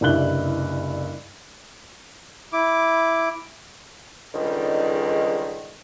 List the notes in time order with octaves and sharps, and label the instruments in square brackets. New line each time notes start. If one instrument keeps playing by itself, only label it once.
[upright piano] F#1 C2 G2 E4 F#6 G7
[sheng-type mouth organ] E4 D6
[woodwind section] C#2 G#2 D3 D#3 G3